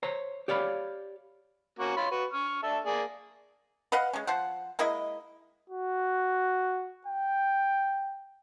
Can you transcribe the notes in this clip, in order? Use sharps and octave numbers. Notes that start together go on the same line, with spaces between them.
C5 C#5 A#5
G4 C#5 D5 F5 B5
A#3 C#4 F#4
F4 C#5 B5
F#4 B4
C#6 F6
D4 A4 E5
A#3 G#4 D5
B4 D#5 F5 F#5
G#3 C#4
F3 C5 F#5
G#3 A#3 E4 D#5
F#4
G5